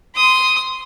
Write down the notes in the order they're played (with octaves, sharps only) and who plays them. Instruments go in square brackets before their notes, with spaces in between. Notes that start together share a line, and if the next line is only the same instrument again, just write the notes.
[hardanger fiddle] C6 D#6